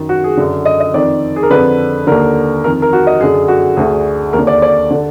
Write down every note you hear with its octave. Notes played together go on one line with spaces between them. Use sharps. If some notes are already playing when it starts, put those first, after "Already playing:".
Already playing: F#2 D#3
F#4
G#4
F#2 D3
D#5
D#5
F2 D#3 D5
G#4
A#4
F2 D3 B4
D#2 D3 A#4
F2 D#3 A#4
A#4
F#4
D#5
F#2 D3 G#4
F#4
D2 D3 G#4
D#2 A#4
D3
D5
D5
D3